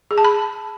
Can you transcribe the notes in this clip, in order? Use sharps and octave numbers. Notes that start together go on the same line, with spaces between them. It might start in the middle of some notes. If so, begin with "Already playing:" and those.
G#4
A5
B5